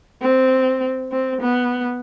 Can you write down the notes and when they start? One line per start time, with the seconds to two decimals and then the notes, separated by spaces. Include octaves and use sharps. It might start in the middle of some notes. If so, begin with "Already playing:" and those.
0.22 C4
1.12 C4
1.42 B3